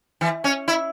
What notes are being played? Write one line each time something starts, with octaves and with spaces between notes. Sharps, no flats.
E3
C#4
E4